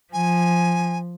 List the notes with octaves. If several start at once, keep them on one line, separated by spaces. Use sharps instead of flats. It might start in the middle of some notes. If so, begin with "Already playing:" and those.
F3 G#5